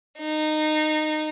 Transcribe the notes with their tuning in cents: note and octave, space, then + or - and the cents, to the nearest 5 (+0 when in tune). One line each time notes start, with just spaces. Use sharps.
D#4 -15